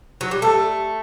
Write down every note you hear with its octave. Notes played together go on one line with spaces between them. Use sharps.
F#3
G3
A3 A4